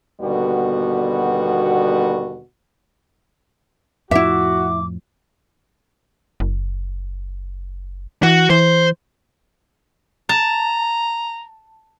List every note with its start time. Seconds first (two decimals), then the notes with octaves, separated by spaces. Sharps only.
0.21 D#2 B2 D3 G3 B3 F#4
4.11 F2 A2 F3 E4 F#4 E5 D6
6.40 F#1
8.23 E3 F#4
8.50 E3 C5
10.29 A5 A#5